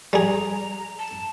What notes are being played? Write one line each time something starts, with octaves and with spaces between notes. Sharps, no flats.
G3 G#4 A#5
A5